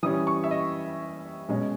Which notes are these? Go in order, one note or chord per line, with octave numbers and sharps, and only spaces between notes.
E3 G3 C#4 D#6
C#6
E5
D#5
B2 G#3 C#4